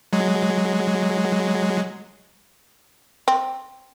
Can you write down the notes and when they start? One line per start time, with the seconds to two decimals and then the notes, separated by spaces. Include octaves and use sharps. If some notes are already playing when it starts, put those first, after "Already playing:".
0.13 F#3 G#3
3.28 C4